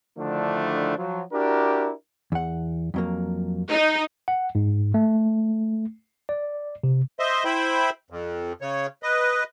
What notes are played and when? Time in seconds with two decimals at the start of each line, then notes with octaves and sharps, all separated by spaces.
0.18 D3 D#3 F3 A3 D4 E4
0.97 F3 F#3
1.33 D4 E4 F#4 G4 A#4
2.32 E2 F#5
2.94 F2 F#3 A#3
3.71 D#4
4.28 F#5
4.55 G#2
4.94 A3
6.29 D5
6.83 C3
7.19 C5 D#5 E5 C6
7.45 E4 C5 E5 G5 B5
8.10 F2
8.61 C#3 C#5
9.03 B4 D#5